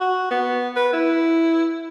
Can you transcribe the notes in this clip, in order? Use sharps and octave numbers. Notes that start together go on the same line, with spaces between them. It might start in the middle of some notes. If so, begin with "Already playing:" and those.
F#4
B3
B4
E4